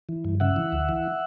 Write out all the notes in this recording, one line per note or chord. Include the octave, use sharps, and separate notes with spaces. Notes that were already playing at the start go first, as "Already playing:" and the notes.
E3
G2
C#3 E5 F#5
E3
D2
E3